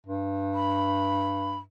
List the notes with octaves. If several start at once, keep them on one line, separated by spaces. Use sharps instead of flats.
G2
B5